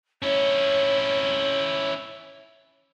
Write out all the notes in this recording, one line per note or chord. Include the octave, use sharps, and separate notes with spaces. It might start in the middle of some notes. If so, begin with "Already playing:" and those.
C#4 E4 C#5